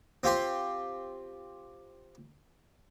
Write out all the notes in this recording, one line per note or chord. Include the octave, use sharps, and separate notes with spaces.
C4 F4 G4 C6